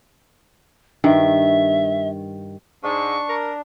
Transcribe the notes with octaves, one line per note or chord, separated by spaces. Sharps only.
G2 D#3 E5
G#2 D4 C#6
A#4